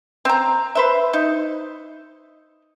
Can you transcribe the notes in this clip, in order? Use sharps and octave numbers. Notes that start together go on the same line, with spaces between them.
C4 A#5
B4 C5 E5
D#4